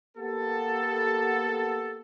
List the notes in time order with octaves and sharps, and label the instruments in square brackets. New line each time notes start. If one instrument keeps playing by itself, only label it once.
[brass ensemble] A#3 B3 G4 A4